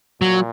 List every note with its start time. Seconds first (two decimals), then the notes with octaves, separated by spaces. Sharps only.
0.21 A#2 F#3